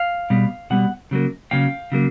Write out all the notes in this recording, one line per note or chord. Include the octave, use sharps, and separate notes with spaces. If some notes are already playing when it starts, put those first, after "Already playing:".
Already playing: F5
B2 G3 B3
B2 G3 B3 F#5
C#3 F#3 A#3
C#3 F#3 A#3 F5 G5
C#3 F#3 A#3